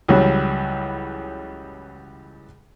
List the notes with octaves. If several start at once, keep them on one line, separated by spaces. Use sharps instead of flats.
C#2 E3 F#3 G3